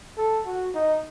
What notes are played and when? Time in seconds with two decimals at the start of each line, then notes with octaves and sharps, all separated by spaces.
0.18 A4
0.46 F#4
0.75 D#4